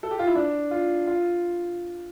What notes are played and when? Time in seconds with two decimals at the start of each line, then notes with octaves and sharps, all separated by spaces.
0.03 A4
0.11 G4
0.19 F4
0.27 E4
0.35 D4
0.71 F4
1.07 F4